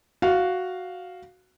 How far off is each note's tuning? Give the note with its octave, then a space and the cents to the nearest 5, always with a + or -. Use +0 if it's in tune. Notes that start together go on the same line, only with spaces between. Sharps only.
F#4 +0 F5 +0